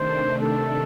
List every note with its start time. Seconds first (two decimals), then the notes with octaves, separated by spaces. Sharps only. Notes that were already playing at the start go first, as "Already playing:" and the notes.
Already playing: C3 D#3 A3 D4 C5
0.40 A4